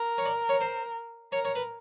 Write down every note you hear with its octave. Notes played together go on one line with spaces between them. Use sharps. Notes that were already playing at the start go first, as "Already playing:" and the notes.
Already playing: A#4
C#5
D5
C#5
C5
A#4 C#5
C#5
B4